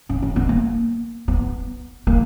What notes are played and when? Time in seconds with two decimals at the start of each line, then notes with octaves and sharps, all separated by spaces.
0.09 C#4
0.22 C#4
0.36 B3
0.49 A#3
1.28 B3
2.07 A#3